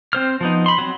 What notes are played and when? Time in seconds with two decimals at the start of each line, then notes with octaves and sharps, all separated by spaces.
0.13 C4 C5 F6
0.41 F3 B3 D#4
0.66 B5 C6
0.78 F#3 C4